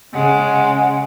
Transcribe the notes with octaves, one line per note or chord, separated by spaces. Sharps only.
C#3 G#3 F#5